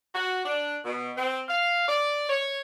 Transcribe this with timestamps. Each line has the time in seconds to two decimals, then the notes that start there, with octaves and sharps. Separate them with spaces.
0.15 F#4
0.46 D4
0.84 B2
1.17 C4
1.49 F5
1.89 D5
2.29 C#5